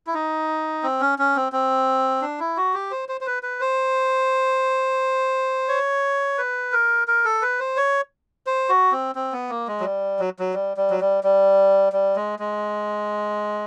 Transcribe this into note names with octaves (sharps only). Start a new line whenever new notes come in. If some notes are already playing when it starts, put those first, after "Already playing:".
E4
D#4
C4
C#4
C#4
C4
C4
D4
E4
F#4
G4
C5
C5
C5
B4
B4
C5
C#5
B4
A#4
A#4
A4
B4
C5
C#5
C5
F#4
C4
C4
B3
A#3
G#3
F#3
G3
F#3
F#3
G3
G3
F#3
G3
G3
G3
G#3
G#3